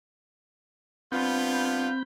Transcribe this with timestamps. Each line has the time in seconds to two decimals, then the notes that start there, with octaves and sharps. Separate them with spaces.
1.12 G2 B3 C4 F4 B5 G6